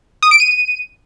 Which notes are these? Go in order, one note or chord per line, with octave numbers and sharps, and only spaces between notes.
D#6
D7
D#7